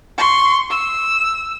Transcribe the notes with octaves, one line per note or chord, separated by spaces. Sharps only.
C6 C#6
E6